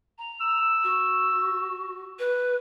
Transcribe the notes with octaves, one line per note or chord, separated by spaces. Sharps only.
A#5
E6
F#4
B4